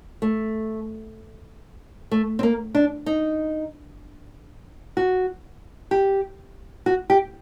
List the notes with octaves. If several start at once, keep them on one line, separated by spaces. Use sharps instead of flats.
A3
A3
C4
A#3
D4
D#4
F#4
G4
F#4
G4